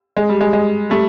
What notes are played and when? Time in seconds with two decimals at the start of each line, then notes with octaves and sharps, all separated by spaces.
0.17 G#3
0.29 G3
0.41 G#3
0.53 G#3
0.90 G3 A3